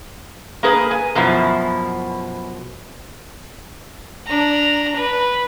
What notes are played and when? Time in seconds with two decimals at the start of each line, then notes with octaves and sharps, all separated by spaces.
0.63 A#3 G#4 B4
0.91 G#5
1.15 F#2 B2 F3 E4
4.26 D4 A#5
4.96 B4